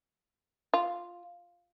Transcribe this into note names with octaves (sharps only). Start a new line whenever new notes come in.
F4